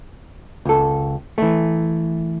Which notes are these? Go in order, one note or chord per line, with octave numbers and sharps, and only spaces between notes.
C#2 A4
E3 A3